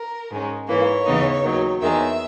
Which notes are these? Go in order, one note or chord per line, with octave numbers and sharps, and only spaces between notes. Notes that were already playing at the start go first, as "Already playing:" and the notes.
Already playing: A#4
G#2 D#3 G#3 C#4
G#2 E3 A#3 C#5
D#2 C#3 E3 B3 D#4
D#2 D#3 F#3
E2 D#3 G#3 E5